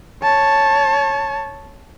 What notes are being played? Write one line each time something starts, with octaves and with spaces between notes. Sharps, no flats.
C#5 A5